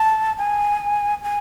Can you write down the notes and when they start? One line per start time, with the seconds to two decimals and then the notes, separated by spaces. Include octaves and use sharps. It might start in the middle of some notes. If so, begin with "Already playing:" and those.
Already playing: A5
0.38 G#5
1.24 G#5